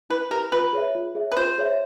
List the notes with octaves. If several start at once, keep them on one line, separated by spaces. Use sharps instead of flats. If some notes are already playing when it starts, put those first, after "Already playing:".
E4 B4
G4 A#4 B4
F4 B4
G#4 C#5 E5
F4
G#4 C#5 E5
B4
F4 C5
G#4 C#5 E5